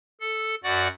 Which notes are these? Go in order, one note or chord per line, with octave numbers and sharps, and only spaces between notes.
A4
F#2 F#4 D5 F#5